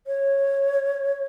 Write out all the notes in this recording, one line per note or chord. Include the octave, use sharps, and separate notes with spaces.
C#5